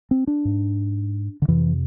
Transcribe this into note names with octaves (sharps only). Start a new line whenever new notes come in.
C4
D4
G#2
D3
F2 C3 E3